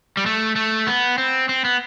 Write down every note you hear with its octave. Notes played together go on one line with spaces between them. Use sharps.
G3
A3
A3
B3
C4
C4
B3